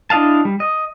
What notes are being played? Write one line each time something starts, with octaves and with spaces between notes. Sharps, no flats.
D4 E4 D#5 F5 A5
G3
D#5